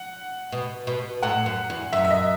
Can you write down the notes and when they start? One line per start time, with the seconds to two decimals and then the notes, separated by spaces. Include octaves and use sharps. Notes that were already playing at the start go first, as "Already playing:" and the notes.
Already playing: F#5
0.52 B2
0.87 B2
1.23 A2 F#5
1.46 F#2
1.70 E2
1.93 F#2 E5
2.05 E5
2.11 D#5